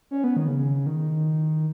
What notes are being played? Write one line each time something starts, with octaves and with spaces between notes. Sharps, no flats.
C#4
B3
D#3
C#3
D#3